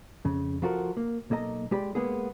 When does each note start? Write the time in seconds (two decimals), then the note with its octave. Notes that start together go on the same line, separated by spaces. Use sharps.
0.25 F2 C#3
0.62 F3 F4 F#4 A4 A#4
0.97 A#3
1.30 B1 A#3 A4 D#5 A#5
1.71 G#3 G4 D5 B5
1.95 G#3 A#3 B3 G#4